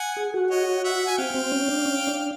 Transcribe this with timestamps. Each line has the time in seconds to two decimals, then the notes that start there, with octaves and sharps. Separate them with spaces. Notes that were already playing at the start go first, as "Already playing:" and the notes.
Already playing: F#5 G#5
0.17 G#4
0.34 F#4
0.50 C#5 D#5
0.84 E5 F#5
1.07 G#5
1.17 C4 F5 G5
1.34 C4
1.52 C#4
1.68 D4
1.85 C#4
2.07 D4